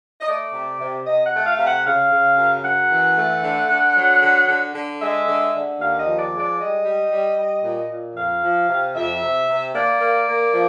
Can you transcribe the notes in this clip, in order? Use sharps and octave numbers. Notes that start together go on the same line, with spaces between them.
D#5
A3 D5
C3
C3
C3 D#5
F#5
A3
F5
C3
F#5
C#3 F5
C#3
F#2
F#2 F#5
E3
A3
D3
D3
F#3
D3
D3
D3
G#3 E5
D3
D3
D#2 F5
D#5
F3
D5
G#3
D5
G3 D#5
G3
G3
G3
A#2
A#2
F2 F5
F3
C3
F2 E5
C3
C3
A#3 D5
A#3
A#3
F3